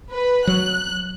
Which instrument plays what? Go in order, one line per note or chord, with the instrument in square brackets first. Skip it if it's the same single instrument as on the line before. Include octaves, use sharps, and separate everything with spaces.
[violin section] B4
[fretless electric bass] F#3 [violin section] F#6